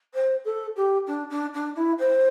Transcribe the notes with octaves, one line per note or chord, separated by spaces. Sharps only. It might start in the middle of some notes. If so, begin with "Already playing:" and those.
C5
A4
G4
D4
D4
D4
E4
C5